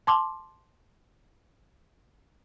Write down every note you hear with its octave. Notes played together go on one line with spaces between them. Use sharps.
A5 C6 D6